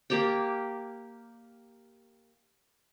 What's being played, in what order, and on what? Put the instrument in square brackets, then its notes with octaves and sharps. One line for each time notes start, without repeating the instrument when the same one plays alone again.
[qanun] A#3 G4 D5 G5